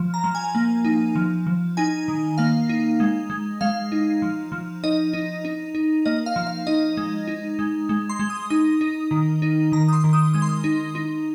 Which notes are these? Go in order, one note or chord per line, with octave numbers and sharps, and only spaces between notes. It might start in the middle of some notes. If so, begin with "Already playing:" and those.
Already playing: F3
A#5
F3
G#5
A#3
D#4
F3
F3
D#4 G#5
D#3
A#3 F5
D#4
G#3
G#3
G#3 F5
D#4
F3
F3
D#4 D#5
D#4
D#4
D#4
A#3 D#5
F5
F3
F5
D#4 D#5
G#3
D#4
G#3
G#3
C6
G#3
D#6
D#4 D#6
D#4
D#3
D#4
D#3 A#5
D#6
C6
D#3
D#6
G#3 D#6
C6
D#6
D#4
D#4